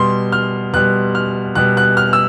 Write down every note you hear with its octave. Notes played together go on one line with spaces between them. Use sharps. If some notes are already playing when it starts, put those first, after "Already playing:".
Already playing: B2 G3 C6
F6
B2 G3 F#6
F6
B2 G3 F#6
F#6
F6
E6